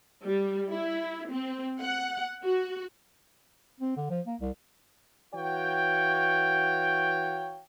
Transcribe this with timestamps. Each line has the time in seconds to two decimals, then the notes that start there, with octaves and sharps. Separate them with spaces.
0.25 G3
0.71 E4
1.31 C4
1.83 F#5
2.44 F#4
3.81 C4
3.97 D3
4.10 F3
4.27 A#3
4.41 C2
5.34 E3 F#4 C#5 F5 G5